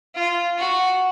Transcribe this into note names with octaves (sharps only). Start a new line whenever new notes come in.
F4
F#4